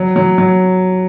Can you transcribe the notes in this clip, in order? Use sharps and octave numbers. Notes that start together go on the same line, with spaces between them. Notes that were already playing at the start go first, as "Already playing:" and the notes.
Already playing: F#3
F#3
F#3